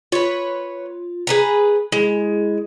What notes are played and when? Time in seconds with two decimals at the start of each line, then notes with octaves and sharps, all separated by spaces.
0.12 F4 B4 C#5
1.27 G#4 B4 A#5
1.92 G#3 E4